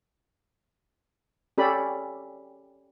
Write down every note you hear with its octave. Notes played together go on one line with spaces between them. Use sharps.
C#4 G4 A4 D5 B5